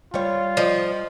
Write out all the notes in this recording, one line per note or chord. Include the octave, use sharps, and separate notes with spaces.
G3 F4 C#5
F3 D5 D#5